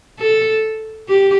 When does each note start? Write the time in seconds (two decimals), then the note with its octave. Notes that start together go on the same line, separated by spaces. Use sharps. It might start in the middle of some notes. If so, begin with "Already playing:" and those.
0.19 A4
1.09 G4